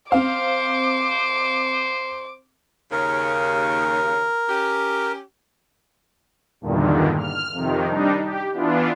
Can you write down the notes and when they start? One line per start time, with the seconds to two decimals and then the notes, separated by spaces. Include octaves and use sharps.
0.12 C4 C5 F5 D6
2.92 D#2 C#3 A#4
4.48 C#4 G4
6.61 E2 G2 A#2 D3 D#3
7.18 F6
7.52 F2 C3 D#3
7.86 G3 D4 D#4
8.22 G4
8.52 E3 B3 D4 F4